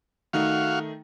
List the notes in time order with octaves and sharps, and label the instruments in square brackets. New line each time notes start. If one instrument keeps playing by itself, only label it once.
[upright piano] D#3 A3 D#4 [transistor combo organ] F#4 F5